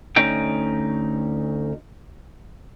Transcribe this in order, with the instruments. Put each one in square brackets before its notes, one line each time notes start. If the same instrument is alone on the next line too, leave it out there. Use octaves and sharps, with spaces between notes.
[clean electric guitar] D2 C#4 D#4 G5